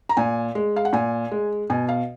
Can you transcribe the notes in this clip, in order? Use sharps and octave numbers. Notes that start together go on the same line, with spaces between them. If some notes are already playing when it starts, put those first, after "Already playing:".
A#5
A#2 G#5
G#3
F5
F#5
A#2 G#5
G#3
B2 G#5
F5